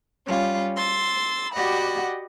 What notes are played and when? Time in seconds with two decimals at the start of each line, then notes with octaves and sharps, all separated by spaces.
0.24 G3 C#4 F4
0.77 C6 E6 A6
1.53 F#4 G4 D5 D#5 F#5 B5